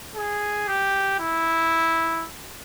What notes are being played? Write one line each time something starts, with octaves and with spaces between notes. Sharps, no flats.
G#4
G4
E4